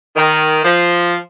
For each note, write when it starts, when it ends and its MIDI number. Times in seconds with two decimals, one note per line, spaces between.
0.16 0.63 51
0.65 1.16 53